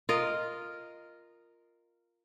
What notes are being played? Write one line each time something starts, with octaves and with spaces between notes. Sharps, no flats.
F4 A#4 D#5